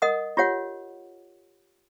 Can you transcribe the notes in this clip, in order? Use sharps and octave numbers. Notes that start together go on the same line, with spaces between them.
A#4 D#5 F#5 D#6
F4 G4 C#5 F#5